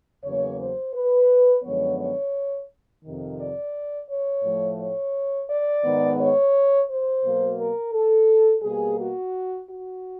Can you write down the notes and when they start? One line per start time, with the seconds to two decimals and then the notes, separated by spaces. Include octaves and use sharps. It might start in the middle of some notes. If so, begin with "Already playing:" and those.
0.24 E2 C#3 F#3 A#3 C#5
0.59 C5
0.94 B4
1.63 F#2 D3 F3 G#3 B3 C#5
1.98 C#5
3.03 F2 C3 D#3
3.38 D5
4.08 C#5
4.43 A2 F3 A3
4.79 C#5
5.48 D5
5.83 G#2 D#3 G#3 B3
6.18 C#5
6.89 C5
7.23 B2 F#3 A#3
7.58 A#4
7.93 A4
8.63 B2 G3 A#3 G#4
8.98 F#4
9.68 F#4